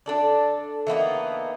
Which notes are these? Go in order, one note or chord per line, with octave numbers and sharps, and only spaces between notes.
D4 A4 D5
E3 A#3 B3 D#4